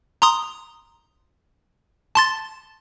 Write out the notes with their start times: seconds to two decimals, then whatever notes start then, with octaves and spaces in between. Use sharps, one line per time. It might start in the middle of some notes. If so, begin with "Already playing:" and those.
0.22 A#5 C6 D#6
2.15 A5 C6 A6